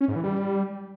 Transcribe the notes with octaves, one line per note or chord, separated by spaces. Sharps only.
C#4
G#2
E3
G3